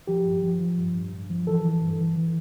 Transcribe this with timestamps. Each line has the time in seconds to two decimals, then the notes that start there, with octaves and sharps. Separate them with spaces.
0.07 F3 G4
0.25 G2
0.43 F3
0.60 F3
0.77 G2
0.95 G2
1.13 G2
1.30 F3
1.47 E3 A4
1.65 E3
1.82 G2
2.00 E3
2.17 E3